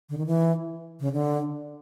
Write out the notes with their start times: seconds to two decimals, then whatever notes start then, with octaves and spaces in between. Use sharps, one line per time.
0.09 D3
0.18 D#3
0.26 E3
1.00 C#3
1.13 D3